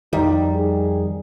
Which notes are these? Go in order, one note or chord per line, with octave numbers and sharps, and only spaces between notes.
F2 D#3 G3 D#4
G#4